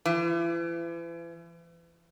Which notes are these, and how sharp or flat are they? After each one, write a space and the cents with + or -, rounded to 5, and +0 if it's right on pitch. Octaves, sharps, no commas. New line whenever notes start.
E3 +40